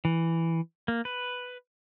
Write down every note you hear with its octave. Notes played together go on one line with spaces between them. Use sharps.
E3
A#3
B4